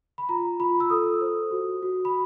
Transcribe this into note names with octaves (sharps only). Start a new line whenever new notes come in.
B5
F4 A#5
F4 B5
E6
A4 D#6
C5
F#4
F#4
B5